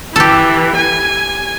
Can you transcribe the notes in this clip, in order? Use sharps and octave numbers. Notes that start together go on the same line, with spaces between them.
E3 G4 A4
G#5